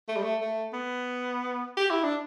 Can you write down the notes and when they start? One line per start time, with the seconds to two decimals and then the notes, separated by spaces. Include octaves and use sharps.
0.08 A3
0.17 G3
0.23 A3
0.41 A3
0.73 B3
1.77 G4
1.90 E4
2.03 D4